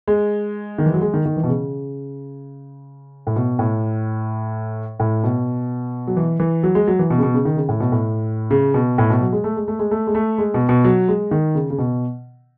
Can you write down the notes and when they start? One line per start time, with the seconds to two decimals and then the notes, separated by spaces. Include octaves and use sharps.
0.08 G#3
0.78 D#3
0.86 E3
0.94 F#3
1.01 G#3
1.14 D#3
1.26 D#3
1.36 E3
1.43 B2
1.48 C#3
3.27 A2
3.36 B2
3.59 A2
5.00 A2
5.24 B2
6.08 F#3
6.17 E3
6.40 E3
6.63 F#3
6.75 G#3
6.87 F#3
6.99 E3
7.10 B2
7.18 C#3
7.23 B2
7.34 C#3
7.45 D#3
7.57 C#3
7.69 A2
7.80 B2
7.92 A2
8.51 C#3
8.74 B2
8.98 A2
9.10 B2
9.21 F#3
9.32 G#3
9.44 A3
9.56 G#3
9.68 A3
9.79 G#3
9.91 A3
10.07 G#3
10.15 A3
10.38 G#3
10.54 B2
10.69 B2
10.84 F#3
11.08 G#3
11.31 D#3
11.55 C#3
11.70 C#3
11.79 B2